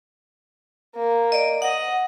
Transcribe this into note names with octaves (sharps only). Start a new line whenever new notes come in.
A#3
D5 D#5
D#5 F#5